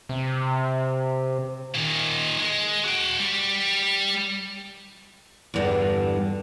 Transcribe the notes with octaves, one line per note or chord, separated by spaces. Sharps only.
C3
A#2 D#3
G#3
F#4 G5
G3
E2 G2 D3